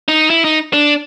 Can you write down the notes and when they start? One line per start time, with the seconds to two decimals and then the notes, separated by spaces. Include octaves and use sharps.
0.08 D#4
0.30 E4
0.44 D#4
0.73 D4